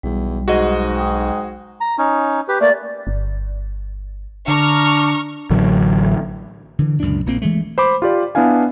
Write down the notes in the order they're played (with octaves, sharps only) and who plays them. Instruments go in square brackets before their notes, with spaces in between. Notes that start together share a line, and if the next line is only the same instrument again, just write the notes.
[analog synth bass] B1 [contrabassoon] E2 [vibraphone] G3
[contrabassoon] G#2 [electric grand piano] F#4 G#4 D#5
[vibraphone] G5 D#6
[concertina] A#5
C#4 D#4
G4 B4
[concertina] A3 A#3 [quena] D5
[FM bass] G1
[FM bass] D3 [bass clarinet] D4 [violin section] A#5 C#6 F6
[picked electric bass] A1 D3 F#3
[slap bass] D3 E3
C#2 F#2 A#2 D4
A#1 A#2 A#3 C4
E3 G#3 A3
[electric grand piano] C5 B5 D6
F4 G4 D5
B3 D4 E4 F5 G#5